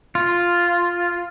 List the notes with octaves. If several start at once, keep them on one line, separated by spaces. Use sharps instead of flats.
F4